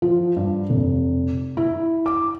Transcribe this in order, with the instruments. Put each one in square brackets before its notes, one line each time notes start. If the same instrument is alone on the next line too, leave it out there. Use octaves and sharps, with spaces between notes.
[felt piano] F3
G2
F1
E4
D6